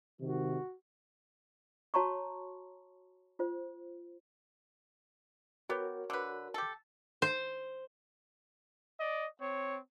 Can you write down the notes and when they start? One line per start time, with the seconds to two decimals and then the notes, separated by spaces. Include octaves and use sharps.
0.21 G#2 C3 D#3 F#4
1.94 F#4 C#5 A5 A#5 C6 C#6
3.39 F4 C5
5.69 B3 F#4 G4 A#4 C#5
6.10 D3 B4
6.54 G4 A4
7.22 C5
9.00 D5 D#5
9.40 C4 C#5